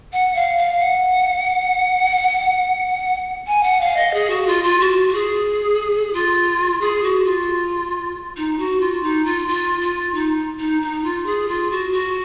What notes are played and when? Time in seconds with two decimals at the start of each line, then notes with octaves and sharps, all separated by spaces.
0.13 F#5
0.35 F5
0.57 F5
0.79 F#5
3.47 G#5
3.63 F#5
3.80 F5
3.96 D#5
4.13 G#4
4.30 F#4
4.47 F4
4.64 F4
4.80 F#4
5.08 F#4
5.14 G#4
6.13 F4
6.81 G#4
7.03 F#4
7.25 F4
8.37 D#4
8.59 F#4
8.80 F4
9.03 D#4
9.25 F4
9.48 F4
9.81 F4
10.14 D#4
10.59 D#4
10.81 D#4
11.04 F4
11.26 G#4
11.48 F4
11.71 F#4
11.92 F#4